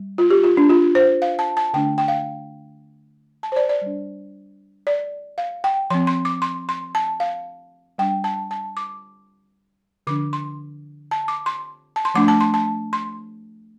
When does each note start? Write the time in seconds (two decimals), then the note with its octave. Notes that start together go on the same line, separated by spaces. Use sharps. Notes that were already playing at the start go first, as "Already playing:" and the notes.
Already playing: G3
0.18 F4
0.30 G4
0.44 F4
0.57 D4
0.70 F4
0.95 C5
1.22 F5
1.39 A5
1.57 A5
1.74 D3 A3 D4 G5
1.98 G5
2.08 F5
3.43 A5
3.52 C5
3.56 D5
3.69 D5
3.82 G3 D4
4.87 D5
5.38 F5
5.64 G5
5.90 F3 C4 C6
6.07 C6
6.25 D6
6.42 C6
6.69 C6
6.95 A5
7.20 F5
7.98 G3 D4 G5
8.24 A5
8.51 A5
8.77 D6
10.07 D3 F3 D4 D6
10.33 C6
11.11 A5
11.28 D6
11.46 C6
11.96 A5
12.05 C6
12.14 F3 A3 D4 D6
12.28 A5
12.40 C6
12.54 A5
12.93 C6